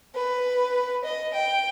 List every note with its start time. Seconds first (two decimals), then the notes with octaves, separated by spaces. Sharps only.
0.15 B4
1.04 D#5
1.34 G5